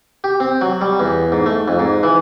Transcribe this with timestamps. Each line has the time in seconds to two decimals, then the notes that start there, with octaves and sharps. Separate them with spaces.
0.24 G4
0.40 C4
0.61 F#3
0.81 G3
1.00 E2
1.32 G#2
1.46 A3
1.68 F2
1.79 G#2
2.03 E3